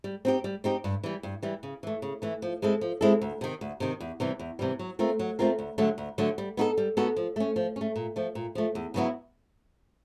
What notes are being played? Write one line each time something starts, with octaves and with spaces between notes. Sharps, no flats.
G3
C4 D#4 G4
G3
C4 D#4 G4
G2
E3 G3
G2
E3 G3
C#3
E3 A3
C#3
E3 A3
F3
G#3 C4 E4 A4
F3
G#3 C4 E4 A4
D2
C3 D#3
D2
C3 D#3
E2
C3 E3 G3
E2
C3 E3 G3
F#3
A3 C4 F4 A#4
F#3
A3 C4 F4 A#4
D2
D3 F#3 A3
D2
D3 F#3 A3
G3
B3 D#4 F#4 A4
G3
B3 D#4 F#4 A4
F3
A3 C#4
F3
A3 C#4
A#2
F3 A3
A#2
F3 A3
E2
C#3 F#3 B3 E4